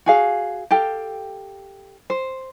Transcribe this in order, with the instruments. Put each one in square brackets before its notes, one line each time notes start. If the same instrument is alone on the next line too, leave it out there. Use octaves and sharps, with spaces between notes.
[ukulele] F#4 G#4 F5
G4 A4 F5 G5
C5